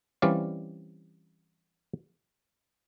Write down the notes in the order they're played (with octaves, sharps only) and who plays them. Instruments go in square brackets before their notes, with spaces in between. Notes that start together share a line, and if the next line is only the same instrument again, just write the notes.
[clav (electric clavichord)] E3 G3 C4 C#4 D5 F5